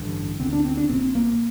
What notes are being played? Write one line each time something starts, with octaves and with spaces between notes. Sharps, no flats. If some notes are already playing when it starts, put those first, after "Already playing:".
Already playing: A1 G2 D3
D2 D3 C4
D4
C4
D4
A#1 A#2 C4
A#3